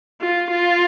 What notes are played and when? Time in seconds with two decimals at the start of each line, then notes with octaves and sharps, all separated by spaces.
0.21 F4
0.51 F4